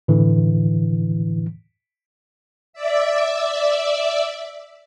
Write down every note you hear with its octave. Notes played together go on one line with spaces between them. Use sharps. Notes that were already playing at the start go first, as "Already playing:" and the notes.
A2 D3 E3
D5 E5